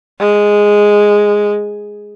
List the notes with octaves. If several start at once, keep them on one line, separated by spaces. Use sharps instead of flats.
G#3